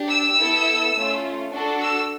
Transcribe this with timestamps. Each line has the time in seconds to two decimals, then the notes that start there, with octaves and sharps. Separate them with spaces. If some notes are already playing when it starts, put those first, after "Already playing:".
Already playing: D4 G4
0.09 E6
0.39 B3 E4 A4
0.95 A3 C#4 F4
1.52 D4 F#4 A4
1.81 E6